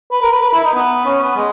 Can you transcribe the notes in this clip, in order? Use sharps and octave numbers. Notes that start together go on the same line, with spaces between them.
B4
A#4
B4
B4
E4
D#4
B3
C#4
B3
G#3